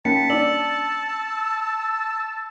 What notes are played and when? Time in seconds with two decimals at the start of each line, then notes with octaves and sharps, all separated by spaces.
0.05 A#3 C#4 G5 A5 B5 C#7
0.30 D4 D5 E6 F#7